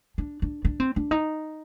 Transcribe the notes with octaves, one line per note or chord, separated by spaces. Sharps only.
D4
D4
D4
C4
D4
D#4